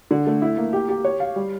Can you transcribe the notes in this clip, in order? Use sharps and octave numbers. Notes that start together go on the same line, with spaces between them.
D3
A3
E4
A#3
G4
G4
C#5
F5
G3